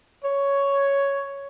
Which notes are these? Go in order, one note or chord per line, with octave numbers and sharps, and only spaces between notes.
C#5